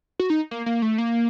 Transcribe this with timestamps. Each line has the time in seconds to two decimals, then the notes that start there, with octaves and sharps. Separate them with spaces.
0.20 F#4
0.30 D#4
0.51 A#3
0.66 A#3
0.82 A3
0.98 A#3